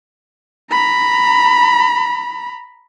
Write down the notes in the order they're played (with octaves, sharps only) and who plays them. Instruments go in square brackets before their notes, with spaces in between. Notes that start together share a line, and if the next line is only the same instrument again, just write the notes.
[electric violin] A#5 B5